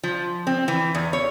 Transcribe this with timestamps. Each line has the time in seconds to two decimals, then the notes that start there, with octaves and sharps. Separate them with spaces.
0.03 F3
0.47 C4
0.68 E3
0.95 E2
1.13 C#5